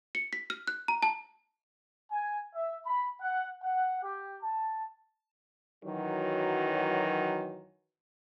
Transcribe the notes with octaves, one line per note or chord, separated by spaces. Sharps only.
C#7
B6
F6
F#6
A#5
A5
G#5
E5
B5
F#5
F#5
G4
A5
F#2 D#3 E3 F#3